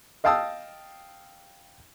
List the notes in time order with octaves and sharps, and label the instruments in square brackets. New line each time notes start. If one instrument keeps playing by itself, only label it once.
[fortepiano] D#5 F5 G5 A5 D#6 E6